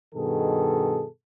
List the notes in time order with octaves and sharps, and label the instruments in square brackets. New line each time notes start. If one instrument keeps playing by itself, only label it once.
[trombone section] G2 B2 D#3 G#4 A4